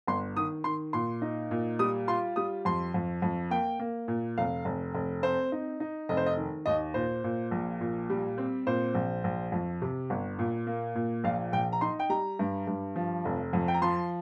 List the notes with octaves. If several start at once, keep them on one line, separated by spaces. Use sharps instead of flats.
G1 C6
D#3 D#6
D#3 C6
A#2 C6
D#4
A#2
G3 D#6
F4 C6
G3 D#6
F2 C6
F2
F2
A#3 G5
A#3
A#2
F1 F5
F1
F1
C4 C5
D#4
D#4
F1 D#5
C5
D#5
D#3
D#2 D#5
A#2 C5
A#2
A#1
A#2
G3
C4
A#2 C5
A#1
A#1
F2
C3
G1
A#2
A#3
A#2
A#1 F5
A#1 G5
A#5
D#4 C6
G5
G3 A#5
G2
G2
F3
F1
F2
G5
A#5
F3 C6